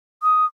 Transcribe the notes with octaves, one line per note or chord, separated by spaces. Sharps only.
D#6